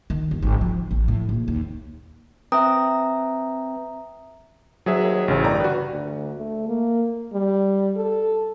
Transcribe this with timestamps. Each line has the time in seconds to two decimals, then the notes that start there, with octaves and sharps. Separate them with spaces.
0.10 D#3
0.31 G1
0.42 G#1
0.61 F3
0.91 A1
1.08 A2
1.29 A#1
1.48 D#2
2.52 C4 B4 E5 G5 A#5 D#6
4.86 D2 F#3 G#4 E5
5.02 D#2
5.28 A1 C#3 E3
5.44 G1 G3 A#5
5.60 F#4 B4
5.91 D2
6.38 A3
6.69 A#3
7.33 G3
7.96 A4